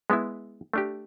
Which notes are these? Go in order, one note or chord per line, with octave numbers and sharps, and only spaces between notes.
G#3 B3 E4
A3 D4 G4